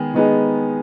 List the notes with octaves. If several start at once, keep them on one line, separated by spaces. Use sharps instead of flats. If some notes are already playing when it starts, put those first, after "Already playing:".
Already playing: D#3 G#3 B3 G#4
D#3 G#3 B3 D#4 G#4